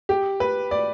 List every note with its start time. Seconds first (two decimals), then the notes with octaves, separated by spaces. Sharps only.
0.09 G4
0.40 B4
0.71 D5